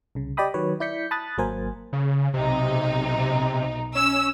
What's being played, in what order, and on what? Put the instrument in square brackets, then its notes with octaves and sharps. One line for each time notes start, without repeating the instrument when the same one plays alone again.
[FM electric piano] C2 C#3
G4 D5 D#5 G5 B5 D#6
D#3 F#3 B4 C#5
E4 D5 G6 B6 C#7
A5 B5 D#6 F#6 A6
G#1 F#3 A#3 A#4 C5 G#5
[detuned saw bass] C#3
[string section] B1 D#4 [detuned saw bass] C3
[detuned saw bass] C3
[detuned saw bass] C#4 [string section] E6